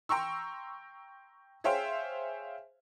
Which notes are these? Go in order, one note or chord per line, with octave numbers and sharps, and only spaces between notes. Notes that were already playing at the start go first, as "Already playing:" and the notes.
G5 A#5 C6 C#6 E6
G#4 C5 C#5 E5 F5 G5